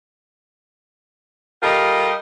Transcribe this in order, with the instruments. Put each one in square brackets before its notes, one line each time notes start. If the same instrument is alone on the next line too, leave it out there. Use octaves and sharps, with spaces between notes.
[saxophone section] G3 F4 G4 A4 A#4 D#5